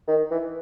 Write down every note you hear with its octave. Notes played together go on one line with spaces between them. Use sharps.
D#3
E3